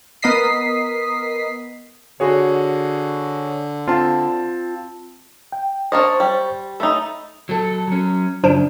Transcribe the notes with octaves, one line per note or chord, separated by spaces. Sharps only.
B3 A#4 D#5 D#6 B6 C7
D3 F#4 G#4 C#5
C4 F4 A5
G5
D4 A#4 C5 D#5 C#6 A6
G3
A3 D#4 E5 B5 E6
F#3 A4
F#3 C#4
F#2 C#3 F3 D4